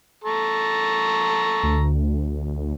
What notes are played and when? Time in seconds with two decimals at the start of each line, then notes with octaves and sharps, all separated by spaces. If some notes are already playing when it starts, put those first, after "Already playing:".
0.24 A4 A#5 C#6
1.63 D2